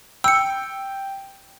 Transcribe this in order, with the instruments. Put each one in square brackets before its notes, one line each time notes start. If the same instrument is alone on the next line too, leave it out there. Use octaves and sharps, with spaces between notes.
[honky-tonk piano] G5 [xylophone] E6 C#7